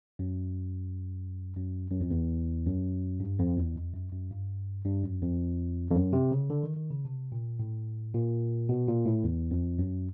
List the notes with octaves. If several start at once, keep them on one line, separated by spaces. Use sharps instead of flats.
F#2
F#2
F#2
F2
E2
F#2
G2
F2
E2
F2
F#2
F#2
G2
G2
F#2
F2
F2
F#2
C3
C#3
D3
D#3
D#3
C#3
C3
A#2
A2
A#2
B2
A#2
A2
E2
F2
F#2